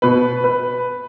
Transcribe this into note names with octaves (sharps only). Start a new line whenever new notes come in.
B2 B4
B4